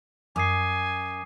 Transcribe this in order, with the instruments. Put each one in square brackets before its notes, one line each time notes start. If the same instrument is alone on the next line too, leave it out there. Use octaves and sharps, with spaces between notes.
[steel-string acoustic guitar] F#2 [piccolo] G#5 [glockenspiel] D6 D#6 C7